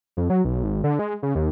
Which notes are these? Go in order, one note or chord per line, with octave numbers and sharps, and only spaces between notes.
F2
F#3
B1
G#1
D3
G#3
C#3
D#2